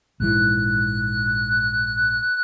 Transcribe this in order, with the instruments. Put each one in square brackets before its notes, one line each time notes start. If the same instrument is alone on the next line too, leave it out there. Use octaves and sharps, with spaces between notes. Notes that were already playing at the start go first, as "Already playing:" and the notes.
[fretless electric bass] A#1 G#2 E3 [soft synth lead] F#6